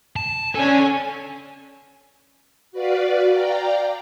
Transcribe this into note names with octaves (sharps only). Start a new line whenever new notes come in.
A5
C#4 A4 D5 G#5
F#4 B4 D5 F5
D5 F5 G5 A#5